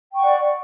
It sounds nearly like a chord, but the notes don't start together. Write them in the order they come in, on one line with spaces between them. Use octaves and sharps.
G5 C#6 F#5 D5